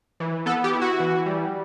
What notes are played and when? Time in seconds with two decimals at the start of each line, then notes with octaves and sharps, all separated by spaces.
0.20 E3
0.46 B3 A4
0.64 G4
0.73 E4
0.82 F#4
1.00 E3
1.26 G3